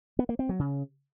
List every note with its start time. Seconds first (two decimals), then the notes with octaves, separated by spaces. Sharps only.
0.19 B3
0.29 A#3
0.39 C4
0.49 F#3
0.59 C#3